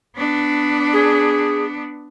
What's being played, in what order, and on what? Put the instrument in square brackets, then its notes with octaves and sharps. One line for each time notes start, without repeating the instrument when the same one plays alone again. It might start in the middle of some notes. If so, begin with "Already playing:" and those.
[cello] B3 D4
[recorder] G#4